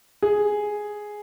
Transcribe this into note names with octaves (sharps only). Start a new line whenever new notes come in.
G#4